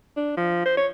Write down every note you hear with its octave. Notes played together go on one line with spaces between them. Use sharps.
D4
F3
C5
C#5